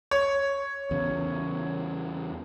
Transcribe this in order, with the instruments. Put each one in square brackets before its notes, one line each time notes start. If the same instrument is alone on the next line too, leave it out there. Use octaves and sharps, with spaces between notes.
[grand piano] C#5
[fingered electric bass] E2 C#3